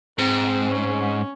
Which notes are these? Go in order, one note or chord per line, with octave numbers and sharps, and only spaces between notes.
G#2 C4
C#4